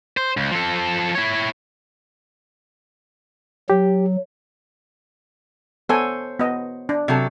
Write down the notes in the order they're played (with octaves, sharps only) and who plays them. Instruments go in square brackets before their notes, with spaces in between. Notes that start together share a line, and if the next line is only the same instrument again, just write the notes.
[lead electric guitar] C5
C#2
F3 A4
E4 C#5
[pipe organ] F#3 [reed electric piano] G4
[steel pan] B3 A4 G#5 [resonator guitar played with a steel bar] C5 C#5
[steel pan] B3 D#5
D4
[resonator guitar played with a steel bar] C3 F#3 A4